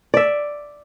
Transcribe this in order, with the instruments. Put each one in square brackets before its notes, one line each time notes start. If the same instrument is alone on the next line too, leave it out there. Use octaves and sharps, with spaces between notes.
[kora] D5 E5